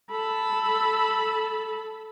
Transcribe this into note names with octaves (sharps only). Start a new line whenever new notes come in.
A4 B5